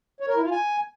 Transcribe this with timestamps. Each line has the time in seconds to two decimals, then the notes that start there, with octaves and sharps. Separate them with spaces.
0.20 C#5
0.28 A#4
0.36 E4
0.44 F4
0.51 G#5